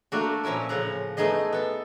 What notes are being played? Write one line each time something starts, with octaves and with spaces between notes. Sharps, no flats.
A3 A#3 D4 F#4
A#2 F3 C#4 E4 A#4
A2 C#3 F3 F#5 A#5
A3 B3 D#4 G#4 D#5
B3 A4